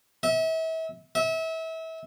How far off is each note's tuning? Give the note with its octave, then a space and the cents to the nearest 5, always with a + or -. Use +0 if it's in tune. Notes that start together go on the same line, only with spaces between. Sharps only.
E5 -35
E5 -30